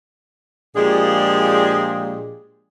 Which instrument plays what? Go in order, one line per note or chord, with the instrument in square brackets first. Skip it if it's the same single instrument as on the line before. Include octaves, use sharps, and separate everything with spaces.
[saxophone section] A#2 F3 G#3 D4 G4 G#4